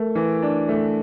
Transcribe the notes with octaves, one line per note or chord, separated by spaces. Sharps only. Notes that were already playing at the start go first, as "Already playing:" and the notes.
Already playing: A3 A#4
E3
D4
A3